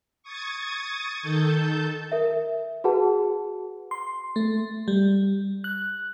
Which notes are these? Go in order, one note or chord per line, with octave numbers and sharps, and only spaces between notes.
C#6 D#6 G#6 A6
D#3 A4 A5 G6
A#4 E5
F#4 G#4 B4 F#5 A5
C6
A3
G3
F#6